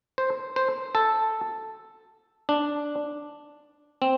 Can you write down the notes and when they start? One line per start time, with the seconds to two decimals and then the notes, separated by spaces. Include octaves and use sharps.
0.18 C5
0.56 C5
0.95 A4
2.49 D4
4.02 C4